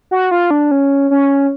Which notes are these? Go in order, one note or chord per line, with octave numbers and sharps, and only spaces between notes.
F#4
F4
D4
C#4
C#4